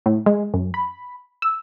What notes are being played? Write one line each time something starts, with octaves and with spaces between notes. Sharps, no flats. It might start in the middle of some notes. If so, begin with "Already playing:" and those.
A2
G#3
F#2
B5
E6